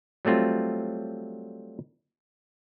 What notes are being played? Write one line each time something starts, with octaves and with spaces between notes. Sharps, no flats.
F#3 G3 A3 C4 F4